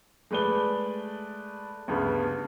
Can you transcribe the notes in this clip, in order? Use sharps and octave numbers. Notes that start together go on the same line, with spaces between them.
G#3 A3 B4 D5 G7
D2 G2 C#3 B3